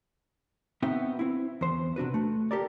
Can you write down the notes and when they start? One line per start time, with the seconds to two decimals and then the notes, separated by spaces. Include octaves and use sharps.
0.82 B3 C4 D#4 F#4 E5 G5
1.19 C4 E4
1.61 E2 C5
1.96 C3 D4 F#4 B4
2.14 A3
2.51 G4 A4 A#4 D5